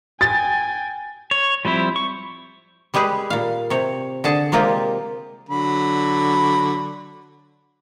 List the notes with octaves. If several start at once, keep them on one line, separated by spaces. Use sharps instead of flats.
G5 G#5 A6
C#5
F3 G3 C4 E4
C#6
G3 G#3 G4 G#4 B4
A#2 F5
C3 C#5
D3 G#4 A5
C3 G#3 A#3 F4 G4
D3 F#3 B5